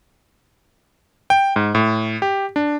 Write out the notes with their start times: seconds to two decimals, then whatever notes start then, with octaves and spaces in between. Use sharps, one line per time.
1.30 G5
1.56 G#2
1.75 A2
2.22 G4
2.56 D4